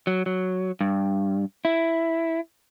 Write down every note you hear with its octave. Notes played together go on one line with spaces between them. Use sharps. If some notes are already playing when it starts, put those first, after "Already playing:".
F#3
F#3
G2
E4